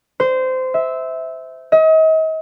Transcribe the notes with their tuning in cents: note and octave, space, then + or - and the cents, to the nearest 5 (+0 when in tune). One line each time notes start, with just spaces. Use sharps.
C5 -20
E5 -15
D#5 +40